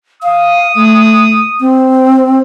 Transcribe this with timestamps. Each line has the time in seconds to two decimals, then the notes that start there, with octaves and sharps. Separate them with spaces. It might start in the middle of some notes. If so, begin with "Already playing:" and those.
0.23 F5 D#6
0.75 A3
1.60 C4